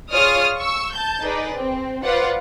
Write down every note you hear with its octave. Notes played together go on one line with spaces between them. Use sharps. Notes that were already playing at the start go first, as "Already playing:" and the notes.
F4 G#4 C#5 D5 D#6 F6
C#6 E6
A5 G6
D#4 G#4 B4 D5
C4
F4 B4 C5 D5 F#5